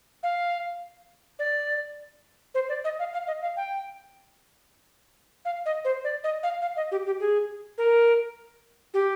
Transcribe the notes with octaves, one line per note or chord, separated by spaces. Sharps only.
F5
D5
C5
D5
D#5
F5
F5
D#5
F5
G5
F5
D#5
C5
D5
D#5
F5
F5
D#5
G4
G4
G#4
A#4
G4